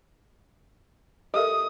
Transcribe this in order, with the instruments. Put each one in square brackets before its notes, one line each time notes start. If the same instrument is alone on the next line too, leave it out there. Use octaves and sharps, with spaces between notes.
[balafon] G4 A4 A#4 [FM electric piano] D#5 E5 [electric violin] D#6